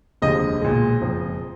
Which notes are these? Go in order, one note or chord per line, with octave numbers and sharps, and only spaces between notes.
F1 D#2 D3 F3 G#3 D#5
B1 A#2 G#3
F#1 F2 F3 G#3